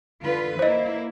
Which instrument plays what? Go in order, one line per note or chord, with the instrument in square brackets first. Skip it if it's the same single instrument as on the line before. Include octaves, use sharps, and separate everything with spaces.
[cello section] D3 F4 B4
[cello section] A#3 E4 [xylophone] C5 D#5